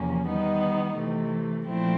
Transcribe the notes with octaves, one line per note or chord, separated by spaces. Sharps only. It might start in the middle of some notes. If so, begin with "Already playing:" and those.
Already playing: E2 C3 F3 A#3 C#4
D#3 G3 B3 D#4
C3 E3 A3
A#2 F3 A3 C4 E4